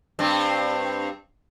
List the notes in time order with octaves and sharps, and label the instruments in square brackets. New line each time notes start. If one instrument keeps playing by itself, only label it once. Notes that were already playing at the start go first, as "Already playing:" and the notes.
[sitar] G2 C4